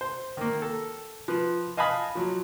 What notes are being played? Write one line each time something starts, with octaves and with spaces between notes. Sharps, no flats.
C5
D#3 A#3
A4
F3 B4
D#5 F5 G#5 A5 B5 D#6
F3 F#3